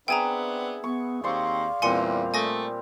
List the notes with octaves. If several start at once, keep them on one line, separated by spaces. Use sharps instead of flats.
B3 C4 D4 G#4 E5 G5 G#5 A#5
B3 C#6
D#2 C4 C5 D5 F5 C6 C#6
E2 A#2 G3 C4 G#5 C6 C#7
A3 G#5 D#6 A#6